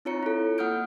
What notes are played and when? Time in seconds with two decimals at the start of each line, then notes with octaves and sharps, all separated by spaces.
0.05 C4 D#4 F4 C#5 A#5 C#7
0.23 E4 A4
0.58 A#3 F#5 D#6 F6 G6 D7